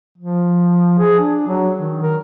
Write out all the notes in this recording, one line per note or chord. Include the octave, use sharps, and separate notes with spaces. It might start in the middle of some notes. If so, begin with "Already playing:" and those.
F3
G#4
D4
F#3
D#3
A#4